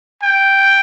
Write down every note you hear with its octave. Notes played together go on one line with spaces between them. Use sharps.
G5